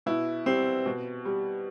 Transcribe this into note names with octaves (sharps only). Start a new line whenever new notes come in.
B2 E4
G3 C4
B2
G3